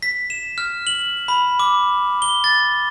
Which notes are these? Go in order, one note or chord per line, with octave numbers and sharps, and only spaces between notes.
B6
E7
F6
F#7
B5
D6
G7
A6